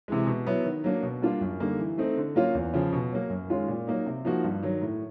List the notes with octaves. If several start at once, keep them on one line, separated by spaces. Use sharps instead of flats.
C3 E3 G#3
B2
F#3 B3 E4
D#3
F#3 A#3 D4
B2
G3 A#3 D4 F4
F#2
D3 G3 A#3 D#4
E3
A3 C4 D#4
D3
F#3 A#3 C#4 F4
E2
C#3 F3
B2
F#3 A#3
F#2
D#3 G#3 C#4 F4
A#2
F#3 A#3 D#4
C3
F3 A#3 D#4 F#4
G2
D#3 F#3
A2